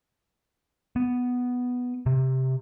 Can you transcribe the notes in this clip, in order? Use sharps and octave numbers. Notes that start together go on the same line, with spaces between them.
B3
C3